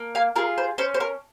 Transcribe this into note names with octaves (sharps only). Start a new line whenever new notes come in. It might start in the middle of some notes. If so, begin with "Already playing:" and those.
Already playing: A#3
F5 G#5
F4 G#4 A#4
C5
C#4 C5
C5
A#4